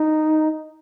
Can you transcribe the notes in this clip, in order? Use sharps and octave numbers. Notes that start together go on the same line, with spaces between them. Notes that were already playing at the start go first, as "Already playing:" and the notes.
Already playing: D#4